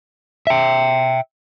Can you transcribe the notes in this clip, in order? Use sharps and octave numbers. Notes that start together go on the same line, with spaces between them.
E5 G5